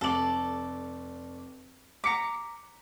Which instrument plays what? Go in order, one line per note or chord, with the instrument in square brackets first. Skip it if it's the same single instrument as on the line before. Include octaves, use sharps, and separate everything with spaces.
[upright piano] F1 F#7 [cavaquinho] A4 D5
[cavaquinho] A#5 D6 [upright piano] B6 C#7